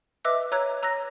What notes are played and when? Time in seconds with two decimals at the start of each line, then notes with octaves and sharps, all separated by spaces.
0.25 B4 D#5 E5 D6 E6 F#6
0.52 C#5 A#5 E6 F#6 G#6
0.83 A#5 E6 F#6 A#6